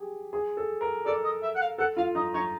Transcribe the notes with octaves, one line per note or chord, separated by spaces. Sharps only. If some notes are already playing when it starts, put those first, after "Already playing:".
Already playing: G4 G#4
G#4
A4
A#4
A4 D5
D#5
E5
F#5
F5
A4 F#5
F4 F5
D#4 D#5
D#4 C#5